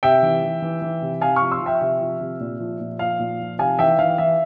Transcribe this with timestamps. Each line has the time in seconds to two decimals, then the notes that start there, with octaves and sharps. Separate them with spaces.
0.03 C3 E5 G5
0.23 E3
0.43 E3
0.62 E3
0.82 E3
1.02 C3
1.21 C3 F5 G#5
1.36 C#6 F6
1.42 F3
1.51 C6 E6
1.61 F3 E5 G5
1.81 C3 E5
2.01 F3
2.21 C3
2.40 A#2
2.60 F3
2.80 A#2
2.99 F3 F5
3.19 A#2
3.39 F3
3.59 C3 F5 G#5
3.79 E3 E5 G5
3.99 E3 F5
4.18 E3 E5